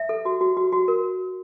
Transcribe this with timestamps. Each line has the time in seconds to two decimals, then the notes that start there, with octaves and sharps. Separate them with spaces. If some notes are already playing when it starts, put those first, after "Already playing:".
Already playing: E5
0.09 A4
0.25 F#4
0.41 F#4
0.57 F#4
0.72 F#4
0.88 A#4